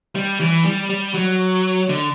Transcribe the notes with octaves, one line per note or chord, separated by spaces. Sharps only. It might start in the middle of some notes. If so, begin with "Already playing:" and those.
G3
E3
G3
G3
F#3
D3